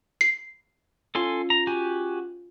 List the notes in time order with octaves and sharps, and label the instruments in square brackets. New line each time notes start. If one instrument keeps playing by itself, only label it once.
[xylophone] C7
[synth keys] C#4 F4 [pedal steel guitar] A4 G#5 C6
[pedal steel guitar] A#5
F#4 G4 G#5